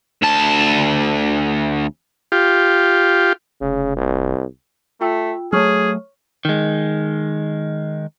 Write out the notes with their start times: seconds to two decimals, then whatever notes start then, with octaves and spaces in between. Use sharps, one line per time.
0.22 D2 A5
2.32 F4 G4
3.61 F1 C#3
3.96 C2
5.01 A3 F4 G5 E6
5.53 F#3 A3 G#4 C#5 C#6 F6
6.45 D#3 G#3